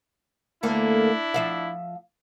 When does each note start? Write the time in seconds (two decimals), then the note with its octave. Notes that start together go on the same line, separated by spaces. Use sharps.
0.63 D2 A#3 D4 E4 A4
1.34 F3 E5 F5